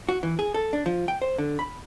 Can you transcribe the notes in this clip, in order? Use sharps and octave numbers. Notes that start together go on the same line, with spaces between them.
F#4
E3
G#4
A4
D4
F3
G5
C5
D3
B5